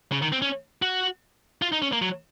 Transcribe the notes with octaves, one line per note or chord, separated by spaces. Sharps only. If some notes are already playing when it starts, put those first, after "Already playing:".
C#3
D#3
C4
C#4
F#4
F4
D#4
C#4
A#3
F#3